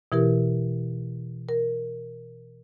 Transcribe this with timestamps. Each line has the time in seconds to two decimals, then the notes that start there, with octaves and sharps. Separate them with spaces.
0.12 B2 E3 E4 G4 A#4
1.49 A#4